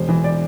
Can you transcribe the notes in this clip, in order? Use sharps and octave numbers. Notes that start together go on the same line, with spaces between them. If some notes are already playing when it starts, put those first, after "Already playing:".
Already playing: E1 C5
E3
D5